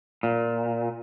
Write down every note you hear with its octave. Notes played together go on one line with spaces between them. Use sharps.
A#2